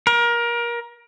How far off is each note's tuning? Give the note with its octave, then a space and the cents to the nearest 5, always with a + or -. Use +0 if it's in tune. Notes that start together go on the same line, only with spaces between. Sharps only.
A#4 +25